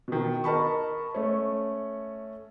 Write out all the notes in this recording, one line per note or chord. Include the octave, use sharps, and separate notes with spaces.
B2 D#3
A#4 D#5 A5 B5 C#6
A3 C#4